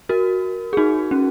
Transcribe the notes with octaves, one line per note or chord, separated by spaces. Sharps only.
F#4 A#4
G#4
D#4 F#4
C#4